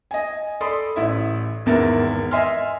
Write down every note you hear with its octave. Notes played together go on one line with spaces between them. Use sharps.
D#5 G#5
A4 D5 B5 C6 D#6
A1 E4 E5
G#1 E2 B3 A#4 E5 A6
D#5 E5 G#5 C6 F6